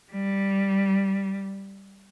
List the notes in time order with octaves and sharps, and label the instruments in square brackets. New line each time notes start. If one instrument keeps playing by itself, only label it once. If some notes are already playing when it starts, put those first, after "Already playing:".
[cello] G3